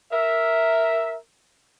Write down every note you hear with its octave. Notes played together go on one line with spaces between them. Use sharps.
A#4 E5